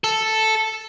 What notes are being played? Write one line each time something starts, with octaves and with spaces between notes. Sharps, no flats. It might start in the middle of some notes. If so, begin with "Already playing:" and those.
A4